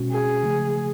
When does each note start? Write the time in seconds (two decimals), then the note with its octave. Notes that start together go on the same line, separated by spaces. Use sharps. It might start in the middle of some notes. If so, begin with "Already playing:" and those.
Already playing: B2 G#3 C#4 F#4
0.11 G#4
0.44 C#3 F3 A3